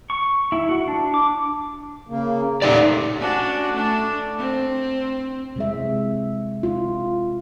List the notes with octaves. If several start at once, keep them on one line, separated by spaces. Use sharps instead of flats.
C#6
E4
F#4
D4
D6
C#3 A#3
C#3 A3 D#4 G4 D5
C#4 D4 F#4
A3 D4
C4
C3 G#3 E5
F4